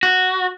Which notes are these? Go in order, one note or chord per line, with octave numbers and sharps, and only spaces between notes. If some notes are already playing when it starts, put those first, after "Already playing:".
F#4